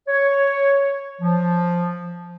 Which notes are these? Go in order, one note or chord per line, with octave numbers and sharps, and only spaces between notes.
C#5
F3